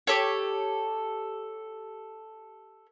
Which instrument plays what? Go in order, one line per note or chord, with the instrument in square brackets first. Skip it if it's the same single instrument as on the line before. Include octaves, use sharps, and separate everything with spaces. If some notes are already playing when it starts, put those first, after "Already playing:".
[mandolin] G4 A4 C#5